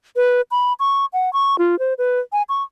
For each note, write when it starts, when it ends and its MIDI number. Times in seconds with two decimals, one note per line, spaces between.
0.16 0.41 71
0.51 0.73 83
0.80 1.06 85
1.13 1.32 78
1.33 1.58 85
1.58 1.78 65
1.79 1.94 72
1.98 2.20 71
2.33 2.43 80
2.49 2.63 85